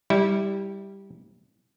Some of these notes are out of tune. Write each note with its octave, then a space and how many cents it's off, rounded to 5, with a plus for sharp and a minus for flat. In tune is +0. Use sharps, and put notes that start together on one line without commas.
G3 +0 E4 -25